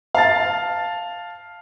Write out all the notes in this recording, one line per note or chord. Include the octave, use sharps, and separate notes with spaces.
F5 A5 A6